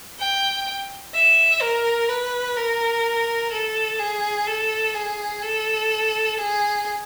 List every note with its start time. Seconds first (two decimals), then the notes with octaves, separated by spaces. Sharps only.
0.19 G5
1.14 E5
1.62 A#4
2.09 B4
2.56 A#4
3.52 A4
3.99 G#4
4.47 A4
4.94 G#4
5.42 A4
6.38 G#4